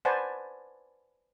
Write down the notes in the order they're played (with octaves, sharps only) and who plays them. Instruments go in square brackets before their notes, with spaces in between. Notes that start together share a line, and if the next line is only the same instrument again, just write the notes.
[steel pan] B4 C5 D5 F#5 G#5 A5